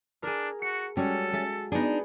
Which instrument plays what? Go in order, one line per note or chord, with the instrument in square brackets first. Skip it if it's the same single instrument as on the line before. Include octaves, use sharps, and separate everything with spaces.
[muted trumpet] D4 [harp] G#4 A#4
[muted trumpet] F#4 [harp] C#7
[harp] G3 G#3 F#4 [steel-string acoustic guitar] C#4 [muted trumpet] A4
[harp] G#3 E5 A6
[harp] B3 G#4 [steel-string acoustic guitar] D4 D#4